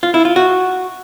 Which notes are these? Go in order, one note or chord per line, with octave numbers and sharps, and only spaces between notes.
F4
E4
F4
F#4